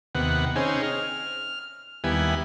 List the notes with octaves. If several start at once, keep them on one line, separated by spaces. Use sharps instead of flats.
D#2 C3 B3 F#5
C4 C#4 D#4 G#4
F6
D#2 G3 B3 E4 G#5